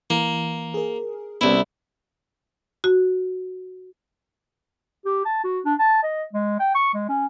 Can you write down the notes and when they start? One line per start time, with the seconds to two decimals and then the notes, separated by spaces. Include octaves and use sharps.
0.10 E3 A#3
0.74 G#4 A#4
1.41 C2 B3 C#4 E4
2.84 F#4
5.05 G4
5.25 A5
5.44 F#4
5.65 D4
5.79 A5
6.03 D#5
6.33 G#3
6.60 G5
6.75 C#6
6.94 G#3
7.09 C#4